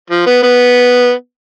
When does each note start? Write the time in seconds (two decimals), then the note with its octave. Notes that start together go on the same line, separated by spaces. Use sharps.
0.10 F3
0.26 B3
0.43 B3